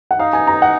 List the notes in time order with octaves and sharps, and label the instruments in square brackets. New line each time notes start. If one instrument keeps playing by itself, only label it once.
[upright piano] F#5
[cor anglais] D#4 [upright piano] F5
[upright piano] G#5
A#5
F#5